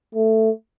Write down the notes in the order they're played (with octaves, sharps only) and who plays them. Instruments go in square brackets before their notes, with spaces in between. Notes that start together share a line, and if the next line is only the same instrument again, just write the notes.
[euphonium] A3